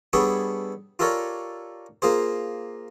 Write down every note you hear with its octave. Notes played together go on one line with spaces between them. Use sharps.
G3 B3 D4 G#4 A4 C#5
F4 G4 A4 A#4 C#5 D5
A#3 F4 G#4 C5